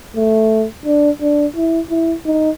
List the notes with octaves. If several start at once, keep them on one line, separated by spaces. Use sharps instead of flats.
A3
D4
D4
E4
E4
D#4